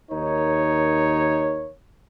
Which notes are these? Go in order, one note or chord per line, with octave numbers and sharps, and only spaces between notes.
D#2 D#4 A#4 C#5